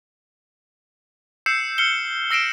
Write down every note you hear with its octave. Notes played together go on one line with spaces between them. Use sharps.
E6 G6 C7 C#7 E7
F6 C7 C#7 G7
E6 A#6 C7 D7 E7